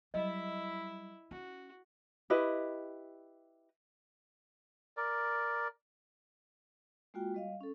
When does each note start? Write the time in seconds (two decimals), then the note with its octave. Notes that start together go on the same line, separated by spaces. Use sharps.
0.14 F#3 G3 E4 D#5 E5
1.31 C#4 F#4
2.30 E4 G4 B4 D#5
4.97 A#4 D5
7.14 G#3 A#3 F4 F#4 G5
7.34 G3 D#5 F5
7.61 C#4 A4